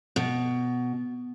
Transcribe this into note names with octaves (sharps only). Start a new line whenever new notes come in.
B2